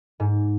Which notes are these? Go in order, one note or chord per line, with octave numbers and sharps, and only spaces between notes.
G#2